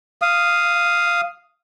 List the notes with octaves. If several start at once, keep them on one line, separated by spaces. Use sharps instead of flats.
F5 D#6